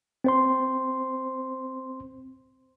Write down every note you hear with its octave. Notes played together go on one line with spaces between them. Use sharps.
C4 C5 C6